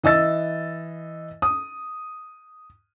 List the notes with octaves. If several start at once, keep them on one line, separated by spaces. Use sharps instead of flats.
E3 D#5 E6 A6
D#6